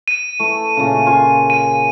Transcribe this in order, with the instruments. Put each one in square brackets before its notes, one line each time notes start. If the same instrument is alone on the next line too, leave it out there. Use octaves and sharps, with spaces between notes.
[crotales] D#7
[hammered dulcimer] E3 A3
A#2 C#3
F4 G#5 C#6
[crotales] D#7